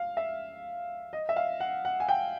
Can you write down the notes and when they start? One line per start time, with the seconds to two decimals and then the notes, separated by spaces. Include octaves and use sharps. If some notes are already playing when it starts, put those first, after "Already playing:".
Already playing: F5
0.17 E5
1.13 D#5
1.29 E5
1.36 F5
1.60 F#5
1.85 F#5
2.00 G#5
2.09 G5